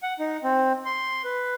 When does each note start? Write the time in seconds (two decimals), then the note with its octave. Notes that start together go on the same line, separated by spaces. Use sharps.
0.03 F#5
0.19 D#4
0.44 C4
0.85 C6
1.24 B4